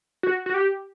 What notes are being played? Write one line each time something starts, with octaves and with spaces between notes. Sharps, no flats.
F#4
F#4
G4